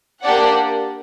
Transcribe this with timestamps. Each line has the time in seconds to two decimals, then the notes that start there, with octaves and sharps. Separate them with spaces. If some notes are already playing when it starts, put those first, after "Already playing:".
0.23 A#3 D4 G4 D5 F#5